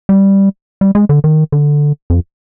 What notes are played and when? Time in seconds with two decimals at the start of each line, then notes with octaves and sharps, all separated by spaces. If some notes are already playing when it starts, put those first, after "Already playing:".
0.09 G3
0.81 G3
0.95 G#3
1.09 D3
1.24 D#3
1.52 D3
2.10 F2